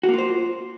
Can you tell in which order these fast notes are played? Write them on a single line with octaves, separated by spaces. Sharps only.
F#4 A#3 F4 C5